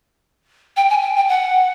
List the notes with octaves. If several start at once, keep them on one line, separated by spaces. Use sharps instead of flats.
G5
G#5
G5
G5
F#5